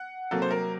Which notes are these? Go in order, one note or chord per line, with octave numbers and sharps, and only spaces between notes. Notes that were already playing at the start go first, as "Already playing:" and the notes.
Already playing: F#5
C3 F#3 A#3 A4
C5
A#4